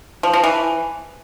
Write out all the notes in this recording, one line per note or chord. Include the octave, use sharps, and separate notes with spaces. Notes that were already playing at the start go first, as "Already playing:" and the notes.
F3
F3
E3